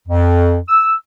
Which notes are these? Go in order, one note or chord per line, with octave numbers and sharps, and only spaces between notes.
F2
E6